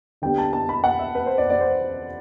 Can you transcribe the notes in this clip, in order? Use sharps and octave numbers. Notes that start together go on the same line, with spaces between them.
D3 G3 B3 D4 G5
A5
A5
B5
F#5
E5
B4
C5
D5
D5
C5